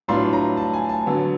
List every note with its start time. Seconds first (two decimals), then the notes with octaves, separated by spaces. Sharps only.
0.08 A2 F#3 B3 D4 F4 C6
0.33 A#5
0.57 A5
0.73 G#5
0.89 A5
1.06 D3 F#3 B3